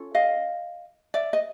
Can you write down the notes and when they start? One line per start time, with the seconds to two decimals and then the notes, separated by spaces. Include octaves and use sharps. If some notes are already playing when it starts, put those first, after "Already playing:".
Already playing: C#4 F4 A4
0.15 D#5 F5
1.14 D5 E5
1.33 D#5